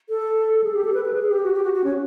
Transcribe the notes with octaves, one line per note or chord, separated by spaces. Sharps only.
A4
A4
G#4
G4
A4
B4
B4
G#4
G4
F#4
G4
F#4
F#4
C#4